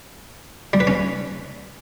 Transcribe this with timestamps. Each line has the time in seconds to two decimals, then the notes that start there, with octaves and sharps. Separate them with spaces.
0.73 G3
0.80 B4
0.87 C#4